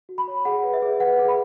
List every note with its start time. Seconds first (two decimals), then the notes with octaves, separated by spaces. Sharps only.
0.09 F#4
0.18 B5
0.28 C#5
0.45 G#4 F#5
0.63 B4
0.74 E5
0.82 G#4
1.00 B4 F#5
1.19 G#4
1.28 B5